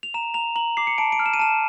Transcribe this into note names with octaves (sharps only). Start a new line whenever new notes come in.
F7
A#5 E7
A#5 F7
A#5 F#7
D6 C7
C#7
A5 D7
D7
F6
E7
D#7
A5 E7